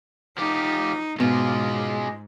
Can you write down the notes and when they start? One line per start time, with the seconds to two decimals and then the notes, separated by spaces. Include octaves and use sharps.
0.38 F3 D#4 G4
1.20 G#2 B2 G#3 F4